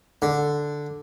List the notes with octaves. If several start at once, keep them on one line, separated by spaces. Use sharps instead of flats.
D3